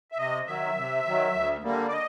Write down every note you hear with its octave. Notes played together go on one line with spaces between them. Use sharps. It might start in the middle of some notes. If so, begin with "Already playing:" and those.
E5
C3 D#5
D#3 F#3 E5
C3
D#3 F#3
D2
D3 G3 A#3
D5
D#5